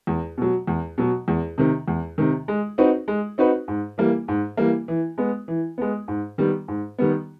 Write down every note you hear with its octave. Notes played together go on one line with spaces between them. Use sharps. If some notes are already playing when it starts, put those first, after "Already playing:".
E2
B2 F#3
E2
B2 F#3
E2
C3 D#3
E2
C3 D#3
G#3
C4 D#4 F#4 B4
G#3
C4 D#4 F#4 B4
G#2
E3 G3 A#3
G#2
E3 G3 A#3
E3
G#3 B3
E3
G#3 B3
G#2
D#3 G3 B3
G#2
D#3 G3 B3